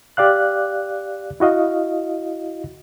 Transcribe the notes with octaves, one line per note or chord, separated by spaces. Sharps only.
G4 D5 F5 F#6
E4 F#4 D#5 F5